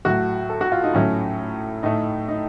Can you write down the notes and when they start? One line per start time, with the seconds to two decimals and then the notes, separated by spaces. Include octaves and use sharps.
0.05 A2 F#3 A3 F#4
0.50 A4
0.61 F#4
0.72 F4
0.83 D#4
0.94 A2 F#3 A3 C#4
1.83 A2 A3 D#4
2.28 D#4